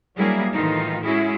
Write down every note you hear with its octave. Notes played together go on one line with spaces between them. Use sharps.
F#3 G3 A#3 D4 E4 G#4
A2 D#3 E3 D#4 F4
G#3 C#4 E4 F#4 G#4